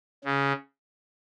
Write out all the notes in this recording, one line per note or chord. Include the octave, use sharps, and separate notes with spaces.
C#3